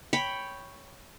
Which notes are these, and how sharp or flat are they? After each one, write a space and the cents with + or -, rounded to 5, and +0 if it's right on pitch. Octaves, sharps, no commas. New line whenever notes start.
C#5 +0 G5 +0 B5 +0